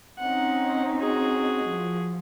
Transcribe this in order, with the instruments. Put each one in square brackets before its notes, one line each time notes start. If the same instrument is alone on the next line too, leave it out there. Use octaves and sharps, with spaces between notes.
[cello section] C4 C#4 D#4 [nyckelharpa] F#5
[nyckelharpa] F#4 G#4
[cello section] F3